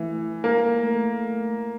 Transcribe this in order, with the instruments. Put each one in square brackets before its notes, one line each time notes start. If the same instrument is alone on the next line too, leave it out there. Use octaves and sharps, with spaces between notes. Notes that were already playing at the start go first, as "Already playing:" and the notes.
Already playing: [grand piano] E3 [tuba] A3
[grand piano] A#3
[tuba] A3